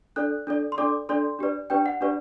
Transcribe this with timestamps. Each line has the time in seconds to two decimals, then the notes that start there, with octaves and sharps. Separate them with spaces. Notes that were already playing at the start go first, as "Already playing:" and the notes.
0.16 D4 A4 D5 F#6
0.47 D4 A4 D5
0.72 C6
0.78 D4 A4 D5 D6
1.09 D4 A4 D5 C6
1.39 D4 G4 B4 D5
1.70 D4 G4 B4 D5 G5
1.86 F#5
2.01 D4 G4 B4 D5